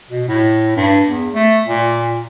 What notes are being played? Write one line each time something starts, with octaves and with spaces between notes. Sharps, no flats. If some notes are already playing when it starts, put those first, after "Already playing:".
B2
A2
G2
E2
A3
A#2